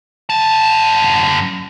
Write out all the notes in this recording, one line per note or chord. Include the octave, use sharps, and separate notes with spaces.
F#2 A5